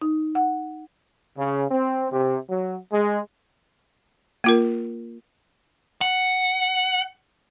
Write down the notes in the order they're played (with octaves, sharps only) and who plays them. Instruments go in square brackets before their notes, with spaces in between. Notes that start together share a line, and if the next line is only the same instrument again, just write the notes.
[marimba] D#4
F#5
[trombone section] C#3
C4
C3
F#3
G#3
[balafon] A#3 F4 A#4
[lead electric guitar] F#5